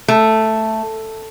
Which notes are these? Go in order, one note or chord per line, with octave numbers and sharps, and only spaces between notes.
A3